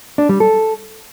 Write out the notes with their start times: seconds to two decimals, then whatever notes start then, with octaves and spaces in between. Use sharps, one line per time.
0.18 D4
0.29 G3
0.40 A4